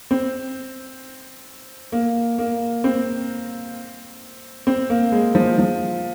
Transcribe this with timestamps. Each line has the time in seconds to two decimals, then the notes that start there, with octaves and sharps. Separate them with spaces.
0.11 C4
1.92 A#3
2.38 A#3
2.84 C4
4.67 C4
4.90 A#3
5.12 G#3
5.35 F3
5.58 F3